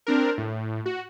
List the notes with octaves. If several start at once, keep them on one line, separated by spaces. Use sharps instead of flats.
C4 D4 A#4
A2
F#4